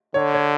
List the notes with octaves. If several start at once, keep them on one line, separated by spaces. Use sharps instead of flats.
D3 C#5
C#5